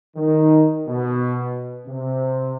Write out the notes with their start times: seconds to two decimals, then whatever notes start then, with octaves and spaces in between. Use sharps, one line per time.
0.16 D#3
0.87 B2
1.87 C3